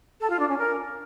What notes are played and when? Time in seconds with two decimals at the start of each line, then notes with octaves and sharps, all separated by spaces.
0.20 A4
0.30 F4
0.39 D4
0.49 C#4
0.58 A#4